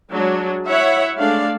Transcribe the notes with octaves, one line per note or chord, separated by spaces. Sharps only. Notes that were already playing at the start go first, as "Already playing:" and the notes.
F#3 G#3 D4
E4 C#5 E5 F#5
G#3 A3 D4 D5 F5